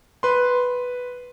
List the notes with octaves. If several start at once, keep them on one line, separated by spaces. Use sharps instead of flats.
B4 C6